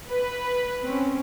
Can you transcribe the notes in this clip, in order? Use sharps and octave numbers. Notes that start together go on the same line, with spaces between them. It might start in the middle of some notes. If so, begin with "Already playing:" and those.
B4
C4 C#4